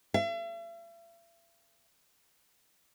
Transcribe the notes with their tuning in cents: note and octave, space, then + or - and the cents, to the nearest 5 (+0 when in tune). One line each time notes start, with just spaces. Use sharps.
E5 +45